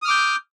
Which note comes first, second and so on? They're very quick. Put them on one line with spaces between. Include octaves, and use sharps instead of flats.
D#6 F6 D6 G6